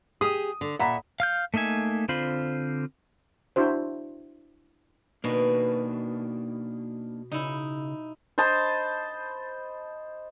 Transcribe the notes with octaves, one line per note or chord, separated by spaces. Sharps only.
G4 G#4 D#6
D3
A#2 E5 F#5 A#5 B5
F5 F6 G6
A3 A#3 D#4 E5 G#5
D3 C4 F4 C5 B5
D4 E4 F#4 C5
B2 A#3 D4 D#4
C#3 D#4 E4
C5 D#5 A5 B5